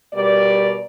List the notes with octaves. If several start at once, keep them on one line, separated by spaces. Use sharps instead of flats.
B2 G3 A#4 D5